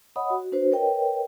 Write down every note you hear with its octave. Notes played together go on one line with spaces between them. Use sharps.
C#5 D#5 F#5 B5 D#6
F#4
D4 F#4 B4 C5
A#4 B4 C#5 D#5 G5